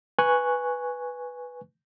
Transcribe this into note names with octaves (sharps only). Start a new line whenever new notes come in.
B4 G#5 C#6 F#6 G#6